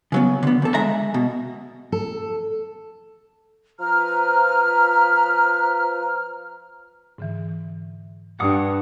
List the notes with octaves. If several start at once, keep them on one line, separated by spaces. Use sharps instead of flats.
C#3 F#3 B3
D3 B3
E2 A4
G#3 E5 A#5
B2
A4
F3 B4 A#5 F6
G#2 D3 E3
G2 D4 F#5 D6 D#6 C#7